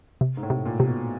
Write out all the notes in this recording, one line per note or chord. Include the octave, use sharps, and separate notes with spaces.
C3
G#2
A2
C3
A#2
C3
B2